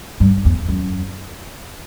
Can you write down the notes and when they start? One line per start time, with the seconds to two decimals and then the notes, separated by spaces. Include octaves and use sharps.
0.20 G2
0.45 E2
0.68 F#2